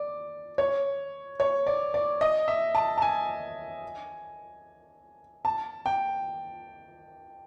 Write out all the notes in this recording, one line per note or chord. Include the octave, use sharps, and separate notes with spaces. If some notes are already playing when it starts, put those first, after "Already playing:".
Already playing: D5
C#5
C#5
D5
D5
D#5
E5
A5
A5
G#5
A5
G5